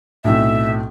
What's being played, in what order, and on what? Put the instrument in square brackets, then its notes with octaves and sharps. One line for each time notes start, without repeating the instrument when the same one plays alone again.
[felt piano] B1 A2 C3 [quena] E5